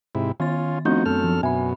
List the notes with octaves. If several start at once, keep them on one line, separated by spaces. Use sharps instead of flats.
G#2 C3 E4
D#3 B3 C#4 F4 A6
F3 A3 B3 C4 D4 D#4 F#4 G6
F#2 A4 F6
F3
F#2 B2 E5 G#5 B5